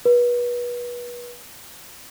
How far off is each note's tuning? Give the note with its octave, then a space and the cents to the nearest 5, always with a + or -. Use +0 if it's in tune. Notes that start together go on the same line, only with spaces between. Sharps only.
B4 -30